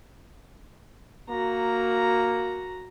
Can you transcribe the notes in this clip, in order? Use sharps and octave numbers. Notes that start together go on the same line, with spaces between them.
A#3 F#4 A#5